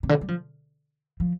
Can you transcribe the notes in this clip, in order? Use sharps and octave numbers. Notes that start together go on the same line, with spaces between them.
C3
D3
G3
F3
F3